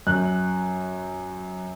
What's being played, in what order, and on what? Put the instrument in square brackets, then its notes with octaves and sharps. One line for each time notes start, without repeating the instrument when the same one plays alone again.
[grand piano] F#2 F#6